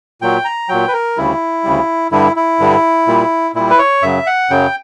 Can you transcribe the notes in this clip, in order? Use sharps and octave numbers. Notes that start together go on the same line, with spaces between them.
A#2 F#3 G5
A#5
A#2 F#3 G5
B4
A#4
D2 C#3 G3 E4
D2 C#3 G3
G2 D3 G3 E4
E4
G2 D3 G3
A#2 G3
A#2 G3 E4
B4
C#5
F#2 C#3 F#3 E5
F#5
F#2 C#3 F#3 G5